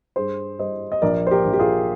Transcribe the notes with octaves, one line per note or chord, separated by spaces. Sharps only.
G2 G#4 C5
G3 C5 D#5
D#5
A#1 A#4 D5
C5
G4 A#4
A#1
G4
F4 G#4